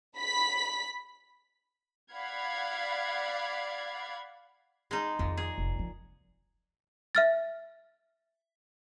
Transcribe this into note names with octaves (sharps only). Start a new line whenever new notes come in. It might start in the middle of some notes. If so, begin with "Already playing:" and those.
B5 B6
D5 F5 F#5 B5 G#6
G#3 D#4
F2 A#2 D#3
G#4
F1
D3 F3
E5 F6 A6